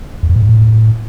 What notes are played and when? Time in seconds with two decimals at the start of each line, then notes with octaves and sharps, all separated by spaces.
0.23 E2
0.29 F2
0.36 A2
0.42 G#2
0.49 A2